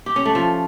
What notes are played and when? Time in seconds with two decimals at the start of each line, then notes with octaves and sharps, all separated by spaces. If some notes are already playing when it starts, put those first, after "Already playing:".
0.06 G4
0.16 C#4
0.25 A3
0.35 F3